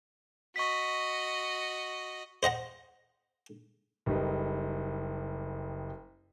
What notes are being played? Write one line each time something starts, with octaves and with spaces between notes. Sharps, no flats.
F#4 D#5 C#6 B6
C5 D#5 F#5 A#5
F#1 G3 D#4 A4 B4